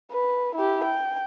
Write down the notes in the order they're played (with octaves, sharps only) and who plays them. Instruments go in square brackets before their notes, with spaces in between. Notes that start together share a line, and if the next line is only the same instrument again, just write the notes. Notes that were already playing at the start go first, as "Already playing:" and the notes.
[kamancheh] B4
E4 G4
G5